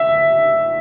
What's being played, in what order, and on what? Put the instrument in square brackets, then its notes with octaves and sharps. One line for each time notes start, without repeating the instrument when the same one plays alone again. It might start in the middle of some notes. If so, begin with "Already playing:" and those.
Already playing: [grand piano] E5